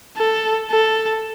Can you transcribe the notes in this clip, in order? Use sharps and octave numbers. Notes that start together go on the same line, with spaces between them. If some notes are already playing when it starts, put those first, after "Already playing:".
A4
A4